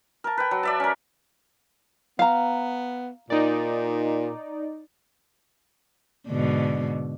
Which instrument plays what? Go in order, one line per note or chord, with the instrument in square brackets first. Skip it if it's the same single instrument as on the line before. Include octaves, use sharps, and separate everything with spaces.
[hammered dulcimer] A#4 A5
B4 G5
F#3
D5 E5 A5
C#4 A#4
[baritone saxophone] B3 [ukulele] F5 A#5
[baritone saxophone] A#2 [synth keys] D#4 D5
[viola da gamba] G#2 B2 D3